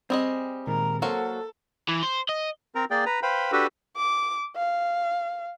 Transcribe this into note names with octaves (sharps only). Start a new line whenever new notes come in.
G3 C4 G#4 D#5
A#2 D#3 G#3 A#4
F#3 A#3 F#4 A4 C5 F5 F#5
E3
C5
D#5
C4 A#4 A#5
A#3 G#4 D5 G5
B4 A#5
B4 C5 F5 G5 B5
D4 F#4 G4 A4 B4
D6
F5